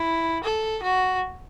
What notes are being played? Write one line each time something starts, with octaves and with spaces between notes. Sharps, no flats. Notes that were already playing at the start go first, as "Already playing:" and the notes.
Already playing: E4
A4
F#4